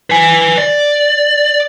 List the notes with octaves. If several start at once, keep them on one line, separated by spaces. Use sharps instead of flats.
B4 G#5
D5